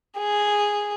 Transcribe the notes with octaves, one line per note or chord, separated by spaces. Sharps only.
G#4